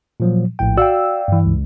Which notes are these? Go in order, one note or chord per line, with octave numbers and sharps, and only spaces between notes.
A#2 F3 F#3
A#1 A2 G5
F#4 D5 F5 G5 E6
G2 E3
C#2